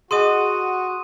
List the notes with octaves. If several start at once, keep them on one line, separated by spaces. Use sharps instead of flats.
F#4 G#4 D#5 G#5 C6 D#6 D#7